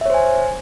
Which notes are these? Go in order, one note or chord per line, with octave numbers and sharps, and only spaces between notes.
C5 C#5 E5 G#5